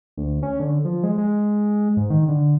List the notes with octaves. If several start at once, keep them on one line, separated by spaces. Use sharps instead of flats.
D2
C#4
D3
F3
G#3
G#3
G#2
D#3
D3